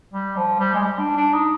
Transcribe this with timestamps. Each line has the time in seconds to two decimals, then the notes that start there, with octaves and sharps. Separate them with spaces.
0.13 G3
0.37 F3
0.59 G3
0.74 G#3
0.82 G3
0.99 D4
1.17 D4
1.34 D#4